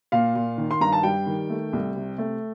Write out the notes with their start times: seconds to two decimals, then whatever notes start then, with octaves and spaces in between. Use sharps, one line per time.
0.12 A#2 F5
0.35 A#2
0.58 D#3
0.71 C6
0.80 G2 A#5
0.92 A5
1.03 G3 G5
1.26 D#3
1.50 A3
1.73 C2
1.96 C3
2.18 A3